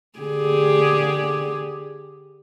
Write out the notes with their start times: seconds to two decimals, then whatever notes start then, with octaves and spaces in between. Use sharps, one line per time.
0.19 D3 G4 G#4